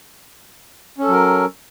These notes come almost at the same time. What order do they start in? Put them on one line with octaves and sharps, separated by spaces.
C#4 A4 F#3 A#4